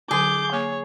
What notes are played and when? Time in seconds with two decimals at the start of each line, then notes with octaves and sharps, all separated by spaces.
0.11 D3 F#3 G#4 D6 G6
0.52 A#3 C#5 G#5 D6